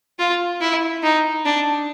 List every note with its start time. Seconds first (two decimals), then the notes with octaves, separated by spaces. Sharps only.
0.19 F4
0.61 E4
1.03 D#4
1.45 D4